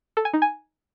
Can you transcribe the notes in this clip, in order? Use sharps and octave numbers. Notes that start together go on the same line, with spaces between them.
A4
G#5
D#4
G#5